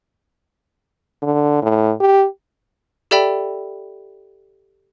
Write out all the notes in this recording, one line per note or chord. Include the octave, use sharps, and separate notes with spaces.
D3
A2
G4
G4 A4 D5 E5 G5 B5